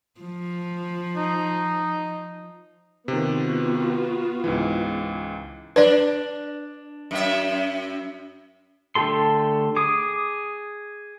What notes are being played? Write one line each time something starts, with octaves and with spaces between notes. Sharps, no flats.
F3
D#4
C3 D#3 B3 F4 F#4
C#2 G#2 E3
D4 B4 D5
F#2 E5
D3 A3 G4 A4 C6
G#4 D6 D#6